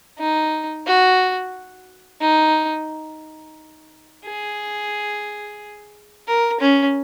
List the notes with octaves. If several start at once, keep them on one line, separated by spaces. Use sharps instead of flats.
D#4
F#4
D#4
G#4
A#4
C#4